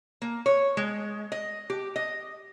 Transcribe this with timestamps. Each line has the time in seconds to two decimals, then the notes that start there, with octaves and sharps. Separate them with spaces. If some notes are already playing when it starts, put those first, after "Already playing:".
0.22 A#3
0.46 C#5
0.77 G#3
1.32 D#5
1.70 G4
1.96 D#5